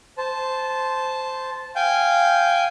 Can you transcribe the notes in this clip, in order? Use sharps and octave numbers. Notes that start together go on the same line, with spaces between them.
C5 A5
F5 G5 G#5 G6